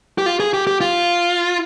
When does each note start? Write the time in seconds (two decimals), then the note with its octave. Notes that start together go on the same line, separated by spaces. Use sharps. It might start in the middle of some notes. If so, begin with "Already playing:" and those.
0.18 G4
0.26 F4
0.40 G#4
0.54 G4
0.67 G4
0.81 F4